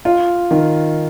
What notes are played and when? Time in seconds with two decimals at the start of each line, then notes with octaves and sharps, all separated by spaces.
0.05 F4
0.51 D#3